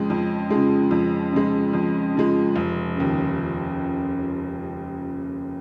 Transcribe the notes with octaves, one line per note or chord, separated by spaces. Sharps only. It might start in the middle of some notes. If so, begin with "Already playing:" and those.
Already playing: F2 C#3 F3 G#3
F2
C#3 F3 G#3
F2
C#3 F3 G#3
F2
C#3 F3 G#3
F1
D#2 C#3